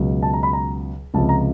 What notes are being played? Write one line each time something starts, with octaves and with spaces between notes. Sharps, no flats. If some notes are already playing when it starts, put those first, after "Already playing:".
Already playing: C#2 B2 F#3
A5
A#5
B5
A#5
C#2 C3 F3 A5
A#5